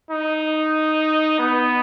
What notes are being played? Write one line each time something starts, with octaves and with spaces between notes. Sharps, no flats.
D#4
B3